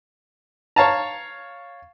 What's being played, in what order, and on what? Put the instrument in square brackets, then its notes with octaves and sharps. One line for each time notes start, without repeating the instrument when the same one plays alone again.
[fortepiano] C#5 F5 A5 A#5